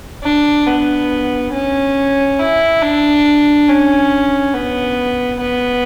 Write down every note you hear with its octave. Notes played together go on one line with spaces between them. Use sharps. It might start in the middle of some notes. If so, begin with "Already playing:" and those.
D4
B3
C#4
E4
D4
C#4
B3
B3